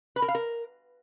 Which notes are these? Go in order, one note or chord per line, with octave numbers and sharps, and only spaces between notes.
B4
A#4
F5
A#4